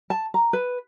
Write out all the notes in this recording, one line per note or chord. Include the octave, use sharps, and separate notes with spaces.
A5
A#5
B4